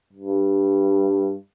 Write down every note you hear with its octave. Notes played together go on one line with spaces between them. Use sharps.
G2